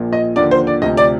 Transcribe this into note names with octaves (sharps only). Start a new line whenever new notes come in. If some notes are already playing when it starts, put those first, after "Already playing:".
Already playing: A#1 A#2 F3
D#5
D#2 D3 F3 D5
C5
D5
D2 C3 F3 D#5
D5